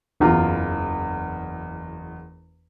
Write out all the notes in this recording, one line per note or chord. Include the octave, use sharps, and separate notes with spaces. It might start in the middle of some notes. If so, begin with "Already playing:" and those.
F#1 E2 F4 A#5